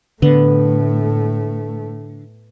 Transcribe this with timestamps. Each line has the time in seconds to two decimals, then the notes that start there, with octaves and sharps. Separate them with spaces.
0.22 A2 D3 A3 B3